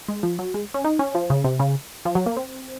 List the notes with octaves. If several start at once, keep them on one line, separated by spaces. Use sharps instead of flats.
G#3
F3
F#3
G#3
C#4
D#4
C#4
F3
C#3
C3
C#3
F3
F#3
A#3
C4